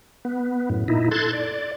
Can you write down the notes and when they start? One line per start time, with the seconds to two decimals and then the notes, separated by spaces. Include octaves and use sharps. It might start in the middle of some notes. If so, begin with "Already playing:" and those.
0.25 B3
0.70 F#2 A2
0.88 A#2 D#4 E4
1.11 A4 C6 F#6 G#6 A6
1.33 D5